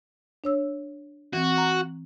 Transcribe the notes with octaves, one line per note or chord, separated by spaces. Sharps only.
D4 C#5 E6
E3 C4 F#4
A#5